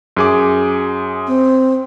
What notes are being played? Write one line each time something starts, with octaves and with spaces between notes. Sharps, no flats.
F#2 G#4 D6
C4